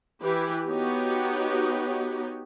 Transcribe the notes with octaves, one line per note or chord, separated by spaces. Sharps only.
E3 E4 G4 B4
B3 D#4 F#4 G4 C#5